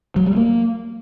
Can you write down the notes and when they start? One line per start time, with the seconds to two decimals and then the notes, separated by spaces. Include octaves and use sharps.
0.16 F#3
0.26 G3
0.36 A#3